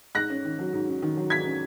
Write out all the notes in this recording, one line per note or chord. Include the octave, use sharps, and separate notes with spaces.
G#2 F#6 A#6
C#4
D#3
F#3
G#2
C#4
D#3
F#3
G#2 G#6 B6
C#4